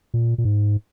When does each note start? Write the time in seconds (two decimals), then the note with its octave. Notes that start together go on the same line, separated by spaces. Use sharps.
0.14 A#2
0.38 A#2
0.45 G#2